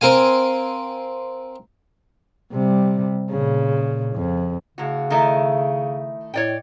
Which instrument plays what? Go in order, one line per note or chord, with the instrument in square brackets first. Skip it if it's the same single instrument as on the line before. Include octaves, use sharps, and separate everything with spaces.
[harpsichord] C4 A#4 F5 G#5
[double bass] C3 G3
A#2 C#3
F2
[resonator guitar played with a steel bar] A2 F#4 [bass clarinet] C#3
[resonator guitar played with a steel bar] D#3 A3 E4
[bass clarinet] A2 [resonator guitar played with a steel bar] C#5 D5 G5